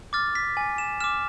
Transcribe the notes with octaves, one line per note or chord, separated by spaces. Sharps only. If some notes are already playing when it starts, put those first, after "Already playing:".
D6 F6 A6
B6
G#5
E7
D6 F6 E7